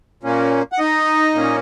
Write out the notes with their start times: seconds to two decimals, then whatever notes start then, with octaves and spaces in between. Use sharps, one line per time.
0.23 A#2 A#3 C#4
0.72 F#5
0.79 D#4 D#5
1.35 A#2 A#3 C#4